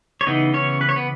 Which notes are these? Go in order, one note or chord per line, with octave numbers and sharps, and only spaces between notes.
C#5
C#3 E3 B3 D#4 D#5
C#4 C#5
B4
C#5
B3 B4